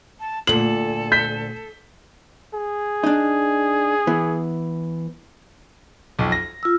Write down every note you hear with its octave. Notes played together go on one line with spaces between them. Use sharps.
A5
D2 A#2 A4 F#7
G6 B6
G#4
D4 D#4
E3 B3
B1 F2
A#6
F4 E6